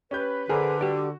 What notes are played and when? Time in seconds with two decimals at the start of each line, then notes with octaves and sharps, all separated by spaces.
0.11 C#4 G4 B4 G6
0.49 D3 G#4 A#4 C5 G#5
0.81 F#4 G4 D5